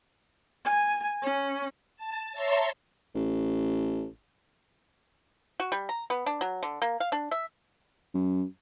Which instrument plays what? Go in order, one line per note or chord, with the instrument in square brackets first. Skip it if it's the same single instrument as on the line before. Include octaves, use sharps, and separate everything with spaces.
[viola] G#5
C#4
[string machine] A5
C#5 E5 A5 A#5 C6
[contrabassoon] A1
[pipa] F#4
G3
A#5
B3
D4
F#3
D3
A#3
F5
D4
E5
[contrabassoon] F#2